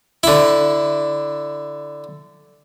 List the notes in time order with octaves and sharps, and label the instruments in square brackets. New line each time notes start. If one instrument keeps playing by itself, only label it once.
[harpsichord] D3 E4